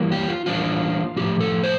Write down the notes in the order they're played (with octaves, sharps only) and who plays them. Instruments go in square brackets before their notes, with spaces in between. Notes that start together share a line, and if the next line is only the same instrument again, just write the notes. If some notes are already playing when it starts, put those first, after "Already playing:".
Already playing: [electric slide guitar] E3 G3 A#3
G4
F4
E3 G3 A#3 D4 F4
A2 F3 C4 G4
A4
C5